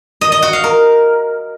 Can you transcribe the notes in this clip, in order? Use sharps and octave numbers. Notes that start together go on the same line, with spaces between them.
D#5
D#5
F#4
F5
A#4